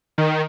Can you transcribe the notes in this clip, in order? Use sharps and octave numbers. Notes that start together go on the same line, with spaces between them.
D#3